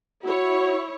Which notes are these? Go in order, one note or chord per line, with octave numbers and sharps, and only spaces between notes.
E4 F#4 C#5